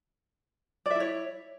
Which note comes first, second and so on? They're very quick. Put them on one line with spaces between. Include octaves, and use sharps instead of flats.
D5 E5 E4 C#5